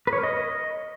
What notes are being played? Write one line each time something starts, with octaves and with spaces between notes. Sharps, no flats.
B4
C#5
A#4
D#5